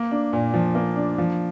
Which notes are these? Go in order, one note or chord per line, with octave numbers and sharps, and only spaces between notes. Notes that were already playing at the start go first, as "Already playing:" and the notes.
Already playing: A#3
D4
A#2
F3
A#3
D4
F3